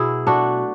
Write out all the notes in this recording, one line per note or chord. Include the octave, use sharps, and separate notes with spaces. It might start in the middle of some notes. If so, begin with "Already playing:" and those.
Already playing: B2 F#3 E4 G#4
A3 D4 F#4